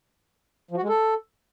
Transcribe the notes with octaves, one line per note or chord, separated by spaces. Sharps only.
F3
F#4
G#3
A4